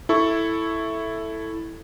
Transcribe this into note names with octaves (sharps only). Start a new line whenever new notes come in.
E4 A4 C#6